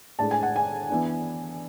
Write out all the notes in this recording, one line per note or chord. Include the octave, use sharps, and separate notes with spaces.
A2 G#3 D4 A5
G#5
F#5
G#5
E3 B3 D4